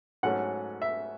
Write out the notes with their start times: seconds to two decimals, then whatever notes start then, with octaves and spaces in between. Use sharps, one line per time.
0.23 G#2 F#3 A3 C#4 F#5
0.82 E5